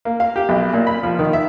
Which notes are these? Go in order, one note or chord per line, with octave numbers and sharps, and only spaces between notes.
A#3
F5
G4
B1
A#2
B5
F3
D#3
E5